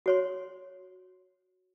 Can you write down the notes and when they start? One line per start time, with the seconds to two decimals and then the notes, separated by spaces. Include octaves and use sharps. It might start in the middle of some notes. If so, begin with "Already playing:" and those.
0.06 F#4 C#5 C6